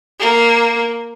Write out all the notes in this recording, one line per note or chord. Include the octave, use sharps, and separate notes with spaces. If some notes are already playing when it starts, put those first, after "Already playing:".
A#3